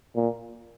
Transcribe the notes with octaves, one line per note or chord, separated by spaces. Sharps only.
A#2